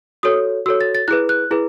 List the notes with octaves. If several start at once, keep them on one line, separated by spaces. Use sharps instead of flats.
F#4 A4 C#5 D#6
F#4 A4 C#5 E6
A6
A6
E4 G#4 B4 F#6
F#6
E4 G#4 B4